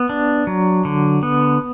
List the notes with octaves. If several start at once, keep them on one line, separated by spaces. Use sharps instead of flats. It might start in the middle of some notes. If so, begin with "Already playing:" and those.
Already playing: B3
D4
F#3
D3
B3